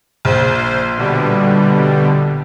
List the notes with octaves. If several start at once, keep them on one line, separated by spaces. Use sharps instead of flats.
A#1 C5
B2 D3 G3